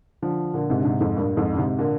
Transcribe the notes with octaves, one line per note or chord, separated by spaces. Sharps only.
D3 F3
A#2 D3
G#2 C3
D3
G#2 C3
F2 G#2
G2 A#2
F2 G#2
D3
G#2 C3
A#2 D3